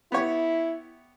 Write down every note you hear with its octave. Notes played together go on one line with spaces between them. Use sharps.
B3 E4 G4 C#5